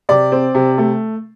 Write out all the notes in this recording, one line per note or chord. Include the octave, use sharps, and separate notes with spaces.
C3 D5
C4
C3
A3